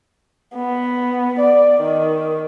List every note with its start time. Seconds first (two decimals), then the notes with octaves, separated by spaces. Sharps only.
0.55 B3
1.39 D5
1.81 D#3